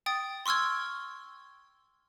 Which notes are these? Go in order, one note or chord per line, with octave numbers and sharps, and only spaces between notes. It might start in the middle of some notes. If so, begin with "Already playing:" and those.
G5 D#6 A6
C6 C#6 E6 F6 G#6